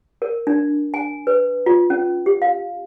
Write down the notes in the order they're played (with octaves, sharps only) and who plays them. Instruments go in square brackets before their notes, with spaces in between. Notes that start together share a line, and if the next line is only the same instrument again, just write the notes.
[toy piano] A#4
D4
G#5
B4
F4
C#4
G4
F5